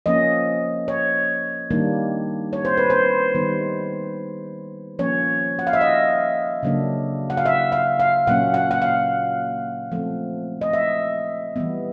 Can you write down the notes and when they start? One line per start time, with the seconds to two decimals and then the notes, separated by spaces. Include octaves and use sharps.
0.06 F3 A#3 C#4 D#5
0.88 C#5
1.70 D#3 G3 A#3 D4
2.53 C#5
2.65 C5
2.77 B4
2.90 C5
3.35 D#3 G3 B3
4.99 F3 A#3 C#4 C#5
5.59 F#5
5.67 F5
5.73 E5
5.81 D#5
6.63 C#3 F#3 A#3 D4
7.30 F#5
7.37 F5
7.46 E5
7.72 F5
7.99 F5
8.27 A#2 F#3 A#3 C#4 F#5
8.54 F#5
8.71 F#5
8.82 F5
9.92 F3 A3 C4
10.61 D#5
10.73 E5
11.56 E3 G3 B3